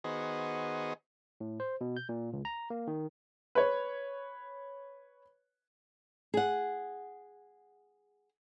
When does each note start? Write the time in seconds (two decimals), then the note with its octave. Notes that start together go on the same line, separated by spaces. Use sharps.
0.04 D#3 B3 F#4 G#4 C5 D#5
1.40 A2
1.60 C5
1.81 B2
1.97 G6
2.09 A#2
2.33 C#2
2.45 A#5
2.70 A#3
2.87 D#3
3.55 B4 C#5
6.34 G#4 F#5